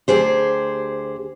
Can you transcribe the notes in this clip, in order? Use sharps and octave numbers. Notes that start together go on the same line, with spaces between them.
D2 G4 G#4 C5